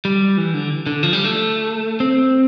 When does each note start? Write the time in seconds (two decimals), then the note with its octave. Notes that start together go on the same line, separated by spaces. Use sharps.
0.05 G3
0.37 E3
0.54 D3
0.86 D3
1.03 F3
1.13 G3
1.24 A3
2.00 C4